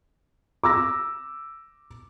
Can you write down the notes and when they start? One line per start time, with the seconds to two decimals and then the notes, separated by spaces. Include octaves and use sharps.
0.64 D6 E6 A#6